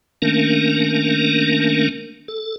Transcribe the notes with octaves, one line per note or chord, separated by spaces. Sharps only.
D#3 A3 A#3 C#4 D4 A#4
A4